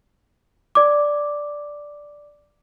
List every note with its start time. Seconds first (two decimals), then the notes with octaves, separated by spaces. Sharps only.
0.75 D5 D6